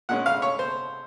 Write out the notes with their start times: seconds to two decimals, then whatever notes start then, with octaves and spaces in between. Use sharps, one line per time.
0.09 A#2 G#3 C#4 F#5
0.26 F5
0.42 C#5
0.59 C5